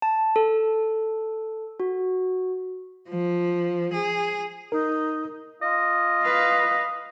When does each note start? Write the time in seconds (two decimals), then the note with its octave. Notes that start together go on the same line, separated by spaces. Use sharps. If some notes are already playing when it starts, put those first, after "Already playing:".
0.02 A5
0.36 A4
1.80 F#4
3.09 F3
3.93 G#4
4.72 D#4 A#4
5.62 F4 D#5
6.23 B4 F5